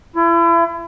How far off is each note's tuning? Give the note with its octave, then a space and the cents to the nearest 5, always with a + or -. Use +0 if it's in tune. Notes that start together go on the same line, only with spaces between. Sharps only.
E4 +35